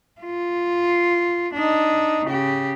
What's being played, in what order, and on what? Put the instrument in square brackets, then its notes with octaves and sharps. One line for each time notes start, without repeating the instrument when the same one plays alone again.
[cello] F4
D4 D#4
C#3 G4